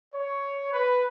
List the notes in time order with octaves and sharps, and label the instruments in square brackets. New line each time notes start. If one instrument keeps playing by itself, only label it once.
[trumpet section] C#5
B4